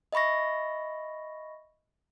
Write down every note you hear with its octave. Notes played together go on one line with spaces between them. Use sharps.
D#5 E5 B5 C#6 A#6